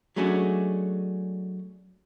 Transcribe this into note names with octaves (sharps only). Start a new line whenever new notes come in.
F#3 G#3 A3 C#4 D4 F#4